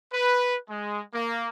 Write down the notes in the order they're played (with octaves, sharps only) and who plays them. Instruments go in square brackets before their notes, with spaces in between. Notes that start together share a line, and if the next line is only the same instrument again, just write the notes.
[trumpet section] B4
G#3
A#3